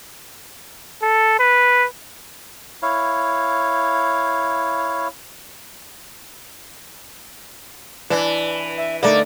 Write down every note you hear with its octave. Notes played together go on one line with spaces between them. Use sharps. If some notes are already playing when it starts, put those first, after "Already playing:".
A4
B4
E4 C#5 F5
E3 D4
E5
D3 A3 A#3 D#4 D5